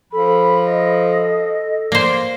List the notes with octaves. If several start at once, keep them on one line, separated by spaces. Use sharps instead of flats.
F3 A4 B5
D#5
A#3 C5 D5